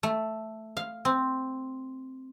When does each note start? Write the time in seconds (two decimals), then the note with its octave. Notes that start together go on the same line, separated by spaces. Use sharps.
0.03 A3
0.77 F5
1.05 C4